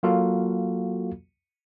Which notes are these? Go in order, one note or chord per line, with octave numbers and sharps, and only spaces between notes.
F#3 A#3 F4 F#4 A4 F5